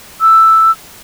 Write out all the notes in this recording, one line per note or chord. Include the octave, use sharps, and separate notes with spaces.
E6